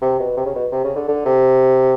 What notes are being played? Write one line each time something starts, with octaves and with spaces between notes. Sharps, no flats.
C3
B2
C3
C#3
B2
C3
C#3
D3
D3
C3